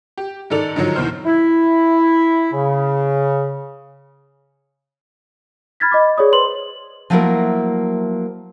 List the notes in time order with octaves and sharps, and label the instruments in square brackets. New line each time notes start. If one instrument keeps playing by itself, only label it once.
[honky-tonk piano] G4
G#2 D#3 A4 D5 F7
G#2 D3 D#3 F3 F#3
E2 B2 D#3 C5 F6
[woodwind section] E4
C#3
[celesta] B5 F6 G#6 A6 B6
D#5 B5 D6
G#4 C#5 D5 D#6
B4 C5 C6 F#7
[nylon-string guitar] F3 F#3 A3 A#3 E4 A#4